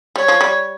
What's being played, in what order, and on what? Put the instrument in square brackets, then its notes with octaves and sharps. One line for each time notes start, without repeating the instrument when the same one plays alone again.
[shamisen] G3 [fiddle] C#5
[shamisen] F3
G3